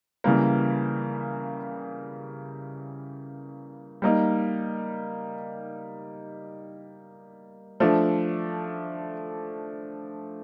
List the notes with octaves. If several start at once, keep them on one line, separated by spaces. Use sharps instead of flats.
C#3 E3 G3 A#3
G3 A#3 D#4
F3 A3 D4